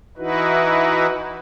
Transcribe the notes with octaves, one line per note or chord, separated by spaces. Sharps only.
E3 D#4 E4 F#4 B4